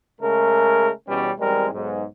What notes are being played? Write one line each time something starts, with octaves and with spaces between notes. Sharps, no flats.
C#3 G#3 A3 A#4
E2 B2 G3 C#4
A1 G3 G#3 C4 A#4
B1 G#2